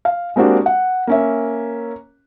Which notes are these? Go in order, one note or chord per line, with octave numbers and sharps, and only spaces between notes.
F5
G#3 A#3 C4 D4 F#4 G4
F#5
A#3 C#4 E5